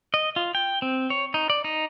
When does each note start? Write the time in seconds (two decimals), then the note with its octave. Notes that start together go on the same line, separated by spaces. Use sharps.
0.14 D#5
0.36 F4
0.55 G5
0.82 C4
1.10 C#5
1.34 D#4
1.50 D5
1.64 D#4